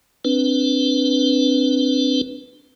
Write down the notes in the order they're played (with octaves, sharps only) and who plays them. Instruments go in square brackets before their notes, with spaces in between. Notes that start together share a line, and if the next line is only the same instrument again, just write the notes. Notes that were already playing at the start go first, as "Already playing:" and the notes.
[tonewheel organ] C4 D4 B4